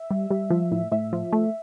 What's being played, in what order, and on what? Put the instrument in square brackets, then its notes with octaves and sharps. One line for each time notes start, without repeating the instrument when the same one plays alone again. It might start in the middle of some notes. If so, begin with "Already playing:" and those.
Already playing: [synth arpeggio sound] E5
G3
G3
F3
A2
A2 E5
F3
A3